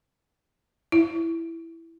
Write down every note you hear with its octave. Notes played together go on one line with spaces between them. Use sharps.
E4